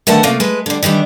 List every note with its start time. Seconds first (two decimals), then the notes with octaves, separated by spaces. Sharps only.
0.07 D3 D#3 A3 B3 F#5 A5
0.23 C3 A3 A#3 C#4 F4
0.40 G#3 B4
0.66 D3 G3
0.83 D#3 E3 G3 D4